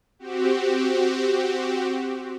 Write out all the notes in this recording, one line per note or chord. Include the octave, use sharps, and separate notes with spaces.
C4 F#4 G4